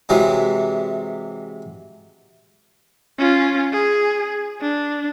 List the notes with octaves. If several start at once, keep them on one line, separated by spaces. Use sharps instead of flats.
C3 E3 F#3 G#3
C#4 F4
G#4
D4